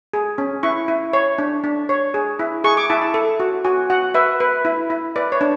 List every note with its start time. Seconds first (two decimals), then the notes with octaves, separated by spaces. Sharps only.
0.13 G#4
0.38 C#4
0.63 E4 C#6
0.88 E4
1.13 C#5
1.38 D4
1.64 D4
1.89 C#5
2.14 G#4
2.39 E4
2.64 G#4 C#6
2.77 D6
2.90 E4 A5
3.02 A5
3.14 A4
3.40 F#4
3.65 F#4 G#5
3.90 F#4 F#5
4.14 B4 E5
4.40 B4
4.65 E4
4.90 E4
5.16 B4 D5
5.32 C#5
5.41 D4